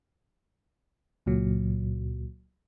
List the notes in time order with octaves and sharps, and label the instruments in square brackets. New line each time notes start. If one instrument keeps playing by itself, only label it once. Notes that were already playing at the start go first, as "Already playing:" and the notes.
[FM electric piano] C#2 A#2 F#3